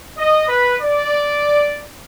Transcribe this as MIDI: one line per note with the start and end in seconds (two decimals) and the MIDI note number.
0.18 0.48 75
0.48 0.75 71
0.81 1.80 74